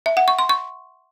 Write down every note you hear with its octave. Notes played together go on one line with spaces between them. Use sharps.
E5
F#5
C#6
C6
C#6